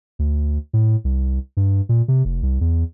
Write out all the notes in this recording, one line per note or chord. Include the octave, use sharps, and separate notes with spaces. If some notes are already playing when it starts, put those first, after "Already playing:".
D2
A2
C2
G2
A#2
C3
F1
C2
E2